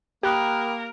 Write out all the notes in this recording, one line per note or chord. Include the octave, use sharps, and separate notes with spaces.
A#3 G4 A#4 G5 B5 D#6 F#6